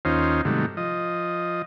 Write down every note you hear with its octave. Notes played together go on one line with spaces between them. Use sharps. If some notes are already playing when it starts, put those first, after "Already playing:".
D#2 C#4 D#4 F4 C5
G#2 C3 D#3 F#3 G3 A3
F3 D#5